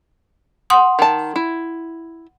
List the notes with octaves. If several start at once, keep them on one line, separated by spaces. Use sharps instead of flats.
F#5 C6 D#6
D#3 A5
E4